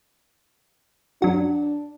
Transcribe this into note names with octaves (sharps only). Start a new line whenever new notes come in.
F#2 D4 F#4